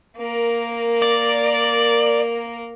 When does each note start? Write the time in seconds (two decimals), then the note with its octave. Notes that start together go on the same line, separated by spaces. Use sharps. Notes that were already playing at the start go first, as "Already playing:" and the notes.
0.18 A#3 A#4
1.02 D5